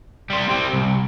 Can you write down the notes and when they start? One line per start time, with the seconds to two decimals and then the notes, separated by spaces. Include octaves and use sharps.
0.30 G3 C5
0.49 G3 C4
0.73 C2